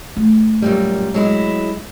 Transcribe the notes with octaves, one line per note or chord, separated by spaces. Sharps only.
A3
F#2 A#2 G3
F#3 G#3 E4